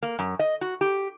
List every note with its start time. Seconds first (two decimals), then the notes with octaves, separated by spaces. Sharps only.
0.03 A#3
0.19 F#2
0.39 D#5
0.61 F#4
0.81 G4